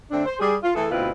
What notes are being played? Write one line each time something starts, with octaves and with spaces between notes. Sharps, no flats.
D3 A3 C4 D4
C5
G3 G#4
F4
E3 A3 G#4 A4
D2 B2 C4 E4 F4 B4